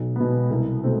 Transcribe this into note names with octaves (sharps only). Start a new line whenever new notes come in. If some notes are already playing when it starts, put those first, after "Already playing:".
Already playing: B1
B2 B3
C2
B2 A3 C4